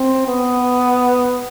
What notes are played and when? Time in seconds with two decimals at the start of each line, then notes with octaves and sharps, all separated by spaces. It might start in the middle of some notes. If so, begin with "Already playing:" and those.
Already playing: C4
0.28 B3